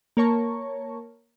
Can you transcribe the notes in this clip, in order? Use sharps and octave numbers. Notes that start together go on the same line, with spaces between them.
A#3 A#4 C#5 A5 C#6